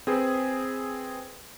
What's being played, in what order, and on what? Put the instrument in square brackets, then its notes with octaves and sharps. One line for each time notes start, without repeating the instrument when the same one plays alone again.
[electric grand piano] C4 G#4 B4